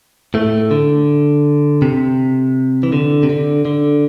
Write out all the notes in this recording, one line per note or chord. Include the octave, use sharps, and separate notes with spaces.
A2 A3
D3
C3
E3
D3
C3
D3
D3